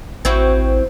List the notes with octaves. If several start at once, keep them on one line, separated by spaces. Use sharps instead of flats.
A1 C4 E4 F#4